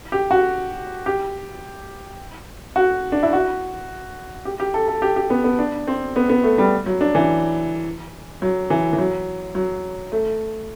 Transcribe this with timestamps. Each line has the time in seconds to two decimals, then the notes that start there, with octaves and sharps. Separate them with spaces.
0.12 G4
0.31 F#4
1.06 G4
2.76 F#4
3.12 D4
3.23 E4
3.33 F#4
4.45 G4
4.60 G4
4.74 A4
4.88 A4
5.02 G4
5.16 G4
5.30 B3
5.44 B3
5.59 D4
5.87 C4
6.16 B3
6.29 B3
6.44 A3
6.58 G3
6.86 F#3
7.01 D4
7.15 E3
8.42 F#3
8.70 E3
8.93 E3
8.98 F#3
9.55 F#3
10.12 A3